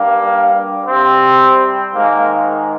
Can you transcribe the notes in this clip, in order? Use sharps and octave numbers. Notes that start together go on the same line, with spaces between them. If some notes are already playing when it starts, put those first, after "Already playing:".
Already playing: G2 G3 A#3
C3 G3 C4
G#2 D#3 G#3 A#3